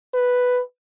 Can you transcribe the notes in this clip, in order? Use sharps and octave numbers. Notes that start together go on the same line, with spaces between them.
B4